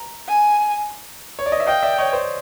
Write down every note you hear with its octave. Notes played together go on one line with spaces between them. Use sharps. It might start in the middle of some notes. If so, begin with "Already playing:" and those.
Already playing: A#5
G#5
C#5
D5
D#5
E5
D#5 F5 G5
D5 E5
C#5 D#5
C5 D5